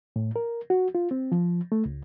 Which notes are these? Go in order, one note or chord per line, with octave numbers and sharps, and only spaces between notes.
A2
A#4
F#4
F4
C4
F3
A3
C#2